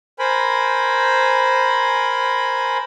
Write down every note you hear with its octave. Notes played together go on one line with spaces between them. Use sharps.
A#4 C5 G#5 B5